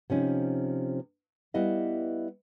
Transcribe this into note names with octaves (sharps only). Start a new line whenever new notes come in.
C3 F3 C#4 D#4
G3 B3 E4 D#5 F5